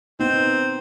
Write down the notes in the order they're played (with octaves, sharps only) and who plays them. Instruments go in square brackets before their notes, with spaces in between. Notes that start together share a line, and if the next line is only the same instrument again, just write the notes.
[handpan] B3 D#4 [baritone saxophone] C4